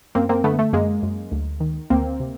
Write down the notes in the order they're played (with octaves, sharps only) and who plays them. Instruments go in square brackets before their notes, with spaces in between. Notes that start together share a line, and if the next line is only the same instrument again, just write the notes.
[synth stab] F#2 A#3 C4
A#3 C4
D3 A3 B3
A3
F#2 G#3 A#3
F#2
D2
D#3
D2 A#3 C4
C3